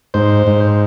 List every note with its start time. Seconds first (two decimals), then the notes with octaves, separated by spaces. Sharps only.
0.14 G#2 C5
0.47 G#2